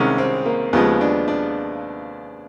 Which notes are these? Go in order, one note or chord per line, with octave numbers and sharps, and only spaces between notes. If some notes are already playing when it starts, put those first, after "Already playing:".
Already playing: C2 C3 D#3 G#3 C#4
C4
A#3
D#2 C#3 F3 G#3 B3
D4
D4